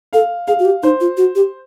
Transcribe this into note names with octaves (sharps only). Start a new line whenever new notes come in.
A4 F5
G#4 F5
F#4
G4
D#4 C5
F4
F#4
G4